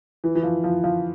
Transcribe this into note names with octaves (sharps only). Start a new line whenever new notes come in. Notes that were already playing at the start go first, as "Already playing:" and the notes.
E3
E3
F3
F3
F3